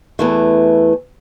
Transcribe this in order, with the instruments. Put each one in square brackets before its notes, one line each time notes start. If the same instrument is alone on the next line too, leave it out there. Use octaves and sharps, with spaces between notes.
[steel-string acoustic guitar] E2 E3 A3